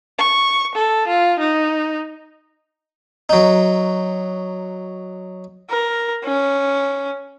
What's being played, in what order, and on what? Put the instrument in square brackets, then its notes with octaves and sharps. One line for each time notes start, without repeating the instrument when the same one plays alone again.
[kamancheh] C#6
A4
F4
D#4
[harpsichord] F#3 D#4
[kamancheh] A#4
C#4